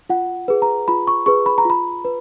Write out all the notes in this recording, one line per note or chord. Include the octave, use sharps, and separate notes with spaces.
F4 F#5
G#4 B4
A#5
F4 B5
C#6
G#4 B4 C#6
B5
A#5
F4 B5
B4